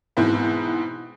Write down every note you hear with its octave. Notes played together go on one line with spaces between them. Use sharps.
G#2 B2 E3 C4 E4